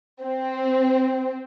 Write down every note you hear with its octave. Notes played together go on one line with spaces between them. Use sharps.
C4